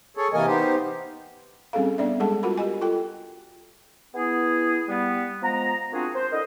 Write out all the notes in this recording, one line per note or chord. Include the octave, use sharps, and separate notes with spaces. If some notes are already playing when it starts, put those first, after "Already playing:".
G#4 A4 C#5
C3 E3 A#3 A#4 D#5 G#5
B3 D#4 G4 C5
G3 C4 C#4 G#4 A4 F5
B3 D4 D5 E5
G3 G#3 G#4 A4 F#5 A5
F4 F#4 A#4 F#5 B5
G4 D#5 G#5
F4 A4 G5
B3 E4 G#4
G3 B3
F3 G#3 B3 A#5
A#3 C4 D4 F4 F#4 G#4
C5
D3 E4 A#4 D#5